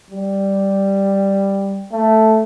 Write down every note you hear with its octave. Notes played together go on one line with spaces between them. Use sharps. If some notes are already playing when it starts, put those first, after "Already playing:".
G3
A3